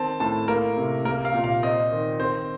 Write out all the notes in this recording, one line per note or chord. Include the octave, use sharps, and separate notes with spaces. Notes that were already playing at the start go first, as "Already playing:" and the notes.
Already playing: D#3 C4 A5
A2 A5
A#3 A#4
C3
A#3 A#4
F5
A#2
F5
C4 D#5
D#3
C4 C5